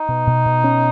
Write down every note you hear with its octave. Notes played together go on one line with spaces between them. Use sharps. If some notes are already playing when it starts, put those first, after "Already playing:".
Already playing: D#4
B2
B2
B2
C#4